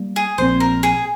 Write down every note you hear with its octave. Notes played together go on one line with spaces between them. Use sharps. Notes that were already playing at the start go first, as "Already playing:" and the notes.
Already playing: G3 A#3
G#4
A#1 A#2 F3 C4 C5
A#4
G#4